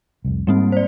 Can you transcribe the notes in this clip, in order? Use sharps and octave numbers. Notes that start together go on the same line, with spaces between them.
F1 C2
G#2 G3 A#3 C4
C5 D5